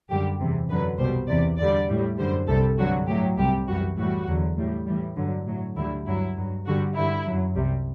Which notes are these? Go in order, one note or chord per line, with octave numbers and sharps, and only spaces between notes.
F#2 D3 G3 G4
E2 C3 E3
F#2 D3 F#3 B4
C2 B2 G3 C5
E2 C3 E3 D5
E2 D3 G3 D5
A2 G3
F#2 D3 G3 C5
C2 C3 G3 A4
G2 D3 F#3 F#4
A2 F#3 G4
C2 C3 G3 G4
F#2 E3 G3 F#4
A2 E3 G3 F#4
E2 D3 F#3
A2 G3
A2 E3 G3
G2 D3 F#3
A2 F#3
D2 D3 G3 E4
G2 F#3 E4
G2 F#3
G2 D3 G3 F#4
G2 D3 G3 E4
F#2 F#3
C2 C3 G3